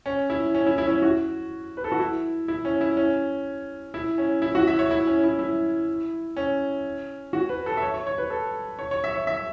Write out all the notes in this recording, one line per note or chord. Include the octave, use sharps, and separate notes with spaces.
C#4
E4
C#4
E4
E4
C#4
E4
F#4
B4
A4
F#4
E4
E4
C#4
E4
C#4
E4
C#4
E4
F#4
E5
C#5
E4
C#4
E4
E4
C#4
F#4
B4
A4
E5
C#5
C#5
C#5
B4
A4
C#5
C#5
E5
C#5
E5